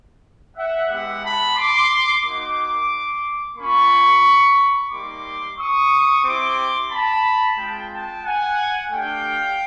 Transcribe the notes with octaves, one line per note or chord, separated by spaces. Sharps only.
E5 F#5
G#3 B3 E4 G4 E5 F#5
A5 B5
C6 D6
A#3 D#4 F#4 C6 D6
A#3 C#4 F4 B5 C#6
G3 A#3 D#4 G4 C6 D6
C#6 D#6
C4 E4 G4 C6 D6
A5 B5
G#3 C4 F4 G5 A5
G5 A5
F#5 G#5
A3 D4 G4 F5 G5